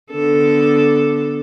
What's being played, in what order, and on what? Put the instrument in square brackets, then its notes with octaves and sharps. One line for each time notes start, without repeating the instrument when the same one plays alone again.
[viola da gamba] D3 B3 A4